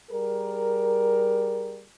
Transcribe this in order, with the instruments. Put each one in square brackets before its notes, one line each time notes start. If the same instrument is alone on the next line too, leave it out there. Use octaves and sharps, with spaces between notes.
[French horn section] G3 G#4 A#4